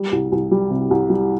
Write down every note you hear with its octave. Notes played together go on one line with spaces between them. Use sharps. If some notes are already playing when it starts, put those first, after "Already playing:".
Already playing: G3
C2
C2
G3
C3
C2
G3